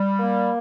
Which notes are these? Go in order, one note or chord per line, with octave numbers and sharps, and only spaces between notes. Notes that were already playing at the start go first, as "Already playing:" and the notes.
Already playing: G3
A#3